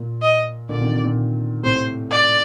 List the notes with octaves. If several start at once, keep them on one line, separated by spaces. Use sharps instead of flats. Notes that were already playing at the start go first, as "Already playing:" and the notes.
Already playing: A#2
D#5
A#2 D3 D5
C3 D#3
C3 D#3
A#2
A2 C3 C5
D5